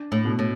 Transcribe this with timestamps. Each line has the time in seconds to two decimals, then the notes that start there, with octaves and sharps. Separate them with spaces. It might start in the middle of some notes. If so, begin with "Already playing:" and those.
Already playing: D4
0.12 A2
0.25 B2
0.39 A2